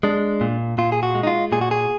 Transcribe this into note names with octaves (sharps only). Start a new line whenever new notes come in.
G#3 D4
A#2
A#2 F4
G#4
F#4
G#3
D#4
F4
A#2 G#4
F#4
G#4